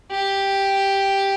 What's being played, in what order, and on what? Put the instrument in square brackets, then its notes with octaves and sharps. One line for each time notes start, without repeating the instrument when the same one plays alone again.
[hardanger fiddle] G4